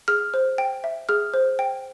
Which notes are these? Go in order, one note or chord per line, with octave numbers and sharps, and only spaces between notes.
G#4 F6
C5
G5
E5
G#4 F6
C5
G5